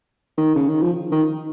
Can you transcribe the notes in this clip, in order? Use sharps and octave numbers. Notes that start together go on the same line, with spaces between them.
D#3
C#3
D#3
F3
D#3